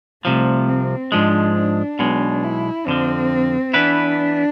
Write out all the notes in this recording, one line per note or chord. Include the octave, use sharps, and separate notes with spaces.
C2 C3 F3 A3
C4
G#2 F3 G#3 D4
D4
B1 B2 G#3
E4
F2 D3 F3 C4
E3 B3 D4 E4 B4